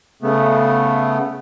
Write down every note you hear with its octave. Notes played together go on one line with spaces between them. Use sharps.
C#3 A3 B3